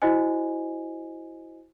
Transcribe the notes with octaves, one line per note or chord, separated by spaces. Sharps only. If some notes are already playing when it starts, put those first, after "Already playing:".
E4 F#4 C5 D#5 G#5